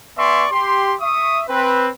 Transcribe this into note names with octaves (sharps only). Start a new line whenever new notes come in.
B3 D5 E5 G#5 C6 C#6
G4 C6
E5 C#6 D#6
C4 B4